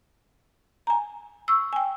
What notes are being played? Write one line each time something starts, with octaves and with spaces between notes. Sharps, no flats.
G#5 A#5
C#6 E6
G5 G#5